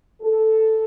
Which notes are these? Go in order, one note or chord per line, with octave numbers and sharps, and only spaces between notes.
A4